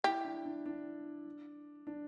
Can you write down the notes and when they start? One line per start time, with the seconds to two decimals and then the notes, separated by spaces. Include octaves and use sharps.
0.04 E4 G4
0.25 D4
0.45 D4
0.66 D4
1.87 D4